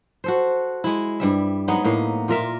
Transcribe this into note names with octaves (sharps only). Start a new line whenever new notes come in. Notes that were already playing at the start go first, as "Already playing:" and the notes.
F#4 A4 C5
G#3 E4
G2 G3 E5
F#3 G#3 B3 D#4
A2 A#3 B3 D#4
A#2 F4 A#4 E5